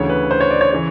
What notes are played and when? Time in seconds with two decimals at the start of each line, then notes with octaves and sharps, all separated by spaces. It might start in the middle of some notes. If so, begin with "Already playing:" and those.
Already playing: D2 C#3 E3 C#5
0.10 B4
0.31 C5
0.41 C#5
0.51 D5
0.61 C#5
0.71 C#3 E3 C#5